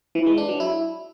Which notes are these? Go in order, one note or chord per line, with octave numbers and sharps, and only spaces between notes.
E3
G#3
D4
F#3
E4